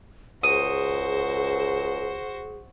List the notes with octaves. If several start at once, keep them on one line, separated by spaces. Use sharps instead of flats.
C#2 F#4 G#4 C5 D#6